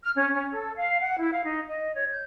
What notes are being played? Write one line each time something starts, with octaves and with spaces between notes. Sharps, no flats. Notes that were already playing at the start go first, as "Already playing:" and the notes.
F6
C#4
C#4
A4
F5
F#5
E4
F5
D#4
D#5
C#5
G6